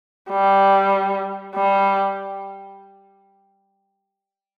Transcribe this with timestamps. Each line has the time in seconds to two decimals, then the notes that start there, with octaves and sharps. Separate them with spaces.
0.31 G3
1.55 G3